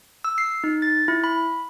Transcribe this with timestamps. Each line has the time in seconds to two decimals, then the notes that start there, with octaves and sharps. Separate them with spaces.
0.24 E6
0.38 C7
0.64 D#4
0.82 A6
1.08 E4
1.24 B5